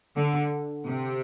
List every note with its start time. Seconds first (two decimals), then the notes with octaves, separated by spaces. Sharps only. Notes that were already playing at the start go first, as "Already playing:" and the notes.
0.15 D3
0.86 C3